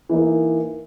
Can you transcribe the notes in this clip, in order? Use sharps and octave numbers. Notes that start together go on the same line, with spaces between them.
E3 A#3 D#4